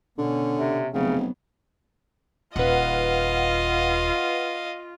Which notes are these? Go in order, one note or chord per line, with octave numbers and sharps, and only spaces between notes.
B2 D3 C#4
C3
F1 C#3 F#3 B3
D#1 F4 B4 D#5 F5 F#5